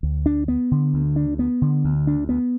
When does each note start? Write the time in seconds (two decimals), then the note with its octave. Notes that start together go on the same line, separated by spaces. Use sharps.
0.03 D2
0.26 D4
0.48 B3
0.71 D3
0.94 D2
1.16 D4
1.39 B3
1.62 D3
1.84 D2
2.07 D4
2.29 B3